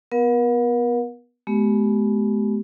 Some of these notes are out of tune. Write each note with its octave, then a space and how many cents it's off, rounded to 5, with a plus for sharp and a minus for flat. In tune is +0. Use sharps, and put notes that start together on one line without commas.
B3 +0 A#4 +40 F#5 -45
G#3 +40 B3 +0 G4 -20